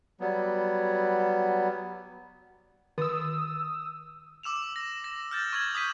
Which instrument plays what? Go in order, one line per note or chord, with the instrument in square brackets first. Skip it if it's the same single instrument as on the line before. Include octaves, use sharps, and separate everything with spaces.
[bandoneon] F#3 G3 B3
[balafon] D#3 [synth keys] D#6 E6
[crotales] D6 E6 E7 F7
A#6
A#6
F6 G6 A6
C#6 G#6 F#7
D#6 G6 B6 D#7